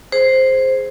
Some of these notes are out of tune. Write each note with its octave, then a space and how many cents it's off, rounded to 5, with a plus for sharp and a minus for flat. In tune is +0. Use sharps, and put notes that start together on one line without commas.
G#4 +0 C5 +0